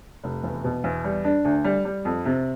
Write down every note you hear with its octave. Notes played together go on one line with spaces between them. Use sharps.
F1
E2
B2
E2
G3
D4
D2
G3
G3
F2
C3